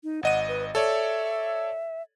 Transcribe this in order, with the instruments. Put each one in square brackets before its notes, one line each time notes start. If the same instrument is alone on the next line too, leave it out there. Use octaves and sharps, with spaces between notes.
[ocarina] D#4
[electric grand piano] G#1 D#5 D#7 [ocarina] F#5
[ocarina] B4
[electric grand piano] A4 C#5 D5 [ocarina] E5